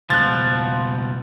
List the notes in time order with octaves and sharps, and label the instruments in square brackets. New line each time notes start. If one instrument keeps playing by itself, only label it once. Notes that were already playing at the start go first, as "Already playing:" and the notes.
[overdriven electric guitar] C#2 B2 [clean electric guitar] F3 [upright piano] F#6 A6